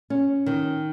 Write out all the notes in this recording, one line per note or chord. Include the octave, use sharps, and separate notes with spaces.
C#4
D#3